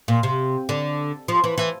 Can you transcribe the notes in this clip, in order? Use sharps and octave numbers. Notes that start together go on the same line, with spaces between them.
A#2
C3
D3
F3
E3
E3